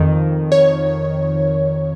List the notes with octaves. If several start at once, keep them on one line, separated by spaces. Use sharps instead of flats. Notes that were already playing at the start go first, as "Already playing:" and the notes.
Already playing: F2 D#3
C#5